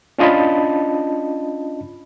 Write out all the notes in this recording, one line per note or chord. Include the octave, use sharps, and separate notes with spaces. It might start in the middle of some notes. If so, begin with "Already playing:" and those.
C#4 D4 F4 D#5 A5 B5